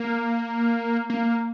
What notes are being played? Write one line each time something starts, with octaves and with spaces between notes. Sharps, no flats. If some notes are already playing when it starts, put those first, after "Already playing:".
Already playing: A#3
A#3